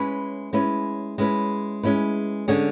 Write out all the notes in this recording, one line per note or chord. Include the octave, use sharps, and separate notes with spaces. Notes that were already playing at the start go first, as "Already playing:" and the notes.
Already playing: G#3 C#4 E4 B4
G#3 C#4 E4 B4
G#3 C#4 E4 B4
G#3 C#4 E4 B4
D3 G#3 C#4 G#4